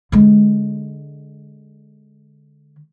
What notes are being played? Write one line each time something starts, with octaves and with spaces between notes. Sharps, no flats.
D3 G#3